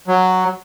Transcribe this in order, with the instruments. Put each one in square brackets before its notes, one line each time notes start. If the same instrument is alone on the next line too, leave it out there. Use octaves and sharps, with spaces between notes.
[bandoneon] F#3